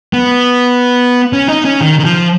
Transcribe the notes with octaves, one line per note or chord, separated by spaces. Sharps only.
B3
C#4
D#4
C#4
D#3
D#3
F3